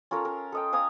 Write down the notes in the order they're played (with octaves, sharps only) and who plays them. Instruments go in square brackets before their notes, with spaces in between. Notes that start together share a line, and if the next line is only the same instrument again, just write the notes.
[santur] C#4 F4 A4 A#4
A#4
A4 D#5 G5
F5 G#5 A#5 D#6